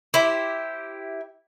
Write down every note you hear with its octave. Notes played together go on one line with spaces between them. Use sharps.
E4 G4 C5